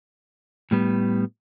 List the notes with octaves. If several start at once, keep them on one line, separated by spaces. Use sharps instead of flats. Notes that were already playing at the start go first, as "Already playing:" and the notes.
A2 G3 B3